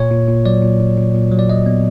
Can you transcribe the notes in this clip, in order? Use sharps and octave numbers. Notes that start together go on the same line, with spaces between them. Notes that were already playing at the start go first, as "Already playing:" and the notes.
Already playing: A#2 C#5
A#2
A#2
F#3 D5
A#2
A#2
A#2
A#2
F#3
D5
F#3 D#5
B3